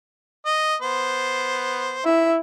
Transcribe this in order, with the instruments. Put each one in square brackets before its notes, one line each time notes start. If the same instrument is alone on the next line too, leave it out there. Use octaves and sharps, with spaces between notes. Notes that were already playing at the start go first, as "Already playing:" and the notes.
[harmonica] D#5
B3 C5
[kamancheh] E4 [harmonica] E5